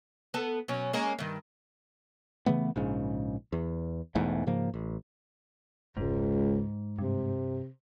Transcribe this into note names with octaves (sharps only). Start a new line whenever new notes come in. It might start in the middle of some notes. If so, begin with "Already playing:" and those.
B3 A4
B2 F#3 C#4
G#3 A#3 C#4
G2 D#3
C#3 E3 A3 B3
A#1 G#2 C#3
E2
E1 E2 G#2 A3
G#2 C#3 F3 A#3
A1
F1 C#2 G#2
G2 C3